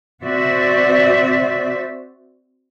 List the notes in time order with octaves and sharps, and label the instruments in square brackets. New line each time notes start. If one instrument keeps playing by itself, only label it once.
[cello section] C4 F#4 C5 D5 E5